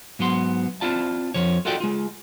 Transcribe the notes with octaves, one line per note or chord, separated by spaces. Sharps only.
G#2 F#3 B3 C6
C4 E4 F4 D5 A5
F2 F3 C#5
F4 F#4 A4 D5 D#5 G5
G#3 F4